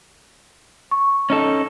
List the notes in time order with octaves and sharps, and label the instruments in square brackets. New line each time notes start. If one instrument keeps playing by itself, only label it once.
[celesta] C#6
[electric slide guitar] C#4 D#4 A4